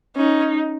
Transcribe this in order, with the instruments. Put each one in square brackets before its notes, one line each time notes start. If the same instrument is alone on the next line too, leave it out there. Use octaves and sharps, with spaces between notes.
[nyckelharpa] C#4 [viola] D#4